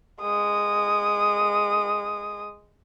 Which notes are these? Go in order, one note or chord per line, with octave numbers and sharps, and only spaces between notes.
G#3 D#6